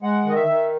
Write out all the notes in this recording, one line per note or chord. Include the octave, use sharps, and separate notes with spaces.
G#3 F#5
D#3 D#5
E5
D#3